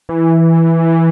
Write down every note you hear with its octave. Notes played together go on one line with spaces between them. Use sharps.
E3